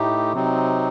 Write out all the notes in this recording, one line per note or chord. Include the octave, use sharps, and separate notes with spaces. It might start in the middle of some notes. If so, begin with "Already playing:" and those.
Already playing: A2 A3 D#4 G4
C3 F#3 C4 D#4